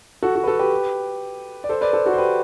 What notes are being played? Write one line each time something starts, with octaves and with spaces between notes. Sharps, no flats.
F#4 A4
F#4
B4
F#4 A4
G4 B4
D5
A4 C5
B4 D5
A4 C5
F#4 A4
C5
G4 B4